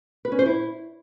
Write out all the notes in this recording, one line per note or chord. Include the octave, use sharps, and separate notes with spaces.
B4
C#4
C5
E4